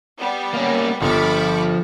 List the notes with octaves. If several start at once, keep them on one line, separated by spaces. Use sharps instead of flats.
G3 B3
A#3 C#4
G1 F3 B5 C#6 D6